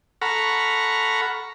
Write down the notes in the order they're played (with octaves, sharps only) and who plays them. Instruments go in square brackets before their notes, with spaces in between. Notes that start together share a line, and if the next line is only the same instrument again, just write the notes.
[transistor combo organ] A4 F#5 A#5 B5 C#6 F6